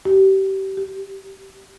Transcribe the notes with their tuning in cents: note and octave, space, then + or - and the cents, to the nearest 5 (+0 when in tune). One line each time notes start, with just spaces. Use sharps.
G4 -30
G4 +0